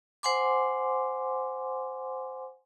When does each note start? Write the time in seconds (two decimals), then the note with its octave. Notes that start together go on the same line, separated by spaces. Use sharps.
0.23 C5 F#5 G#5 C6 D6